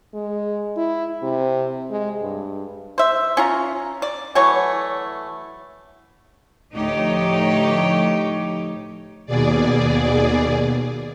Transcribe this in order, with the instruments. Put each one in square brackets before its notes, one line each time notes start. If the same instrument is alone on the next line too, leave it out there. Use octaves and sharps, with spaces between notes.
[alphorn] G#3
E4
C3
G#3
G2
[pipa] C5 E5
C#4 F4 A#5
D5
E3 F#3 A3 C#5
[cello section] D2 A2 F3 D#4 G4 C#5
[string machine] D#2 B2 G#4 D5